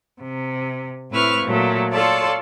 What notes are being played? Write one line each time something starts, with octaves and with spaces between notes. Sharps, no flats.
C3
A2 C4 E4 B4 C#6 F6
A#2 F#3 A3
F4 A4 C#5 D5 A5 C6